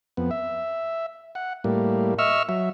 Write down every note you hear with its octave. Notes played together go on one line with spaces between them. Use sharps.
F2 B3
E5
F#5
A2 G3 A#3
D#5 E5 C#6 E6 F6
F#3 E5